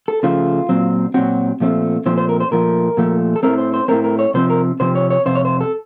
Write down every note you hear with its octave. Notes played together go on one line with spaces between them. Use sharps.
A4
C#3 F3 A3 F4
A#2 F#3 C4
A#2 F#3 C4 F#4
A#2 F3 A3 C4
A#2 F3 A3 C4 C5
C5
A#4
C5
A#2 F3 A3 A#4
A#2 F3 A3
A4
A2 A3 C4 A#4
C5
C5
A2 A3 C4 A#4
A#4
C#5
C3 F3 C4 C5
A#4
C3 F3 C4 C5
C#5
C#5
F2 C3 C5
C#5
C5
A4